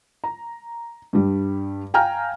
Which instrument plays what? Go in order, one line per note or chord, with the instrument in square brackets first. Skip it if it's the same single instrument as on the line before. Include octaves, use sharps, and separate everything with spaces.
[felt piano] A#5
G2 G3
F5 G5 G#5 A#5 F6